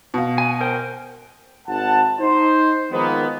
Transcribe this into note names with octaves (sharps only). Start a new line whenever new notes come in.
B2 F5
G#5
A#4 C5 G5
G#1 F#5 A5
D#4 C5
D#3 F3 G#3 A#3 B3